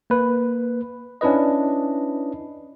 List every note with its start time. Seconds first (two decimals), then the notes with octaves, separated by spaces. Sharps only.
0.10 A#3 B4
1.21 C#4 D4 E4 B4 D#5